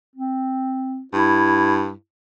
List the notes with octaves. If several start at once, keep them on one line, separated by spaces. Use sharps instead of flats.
C4
G2 E4